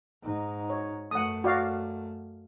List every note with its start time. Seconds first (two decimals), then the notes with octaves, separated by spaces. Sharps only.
0.23 G#2 D#4
0.70 C#5
1.11 F#2 A3 F#5 D#6
1.44 F#4 D5 F5